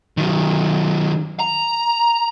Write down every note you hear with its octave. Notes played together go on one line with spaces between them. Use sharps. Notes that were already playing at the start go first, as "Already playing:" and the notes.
D#3 F#3
A#5